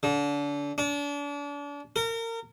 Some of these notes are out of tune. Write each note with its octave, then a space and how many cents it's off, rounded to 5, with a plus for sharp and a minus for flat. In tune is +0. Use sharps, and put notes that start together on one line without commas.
D3 -30
D4 -35
A#4 -30